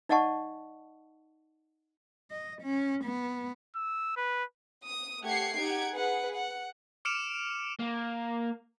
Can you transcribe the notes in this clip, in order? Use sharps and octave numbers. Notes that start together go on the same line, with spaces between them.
D#4 D5 D#5 F#5 A5 C#6
D#5
C#4
B3
E6
B4
D#6
A3 G4 F#5 G#6 C7 C#7
D#4 G4 F#5 G#6 D7
G#4 B4 F#5
F#5
D6 F6 C#7 D7 E7 F7
A#3